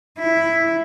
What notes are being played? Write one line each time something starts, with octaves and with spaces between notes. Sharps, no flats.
E4